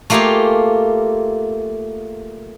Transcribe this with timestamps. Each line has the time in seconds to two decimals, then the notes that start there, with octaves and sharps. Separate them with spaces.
0.10 A3 A#3 F4 G4 G#4 F5